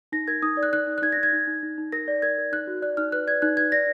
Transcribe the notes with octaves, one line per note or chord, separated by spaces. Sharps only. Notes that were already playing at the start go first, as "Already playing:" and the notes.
D#4 A#6
A#4 G#6
D#4 D#6
D5
F#6
D#4 F#6
D#4
F#6
D#4 G#6
A#6
D#4
G#6
D#4
D#4
D#4
D#4
A#4 A#6
D5
A#4 G#6
A#4
D#4 F#6
F#4
D5 F#6
D#4 F6
B4 F#6
D5 G#6
D#4 F#6
B4 G#6
D5 A#6